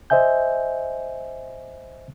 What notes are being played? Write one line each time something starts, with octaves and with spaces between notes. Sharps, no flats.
C5 D#5 E5 G#5 G6